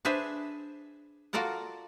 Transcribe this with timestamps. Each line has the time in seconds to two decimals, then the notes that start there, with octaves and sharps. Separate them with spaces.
0.05 D4 G#4 B4 C5 E5 G#5
1.33 F4 F#4 A4 A#4 D5 F#5